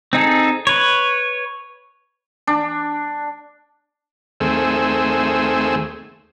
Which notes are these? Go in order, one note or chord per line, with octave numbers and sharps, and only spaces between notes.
C4 D#4 G#4 A4
B4 C#5
D4
D#2 A3 C4 G#4 E6